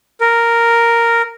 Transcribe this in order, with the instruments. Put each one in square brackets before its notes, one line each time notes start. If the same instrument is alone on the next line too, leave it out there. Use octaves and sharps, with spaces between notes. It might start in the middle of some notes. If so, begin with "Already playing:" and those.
[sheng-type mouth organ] A#4